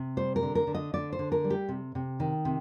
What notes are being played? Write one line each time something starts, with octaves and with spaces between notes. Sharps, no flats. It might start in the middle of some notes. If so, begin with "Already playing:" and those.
Already playing: C3
G3 C5
A#4
D3
A#4
D3
D#5
D3 D5
C5
D3
A#4
G3
G4
C3
C3
D#3
C3